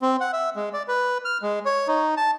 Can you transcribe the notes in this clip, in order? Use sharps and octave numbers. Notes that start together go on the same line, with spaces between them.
C4
F#5
E5
G#3
D5
B4
F6
G#3
C#5
D#4
A5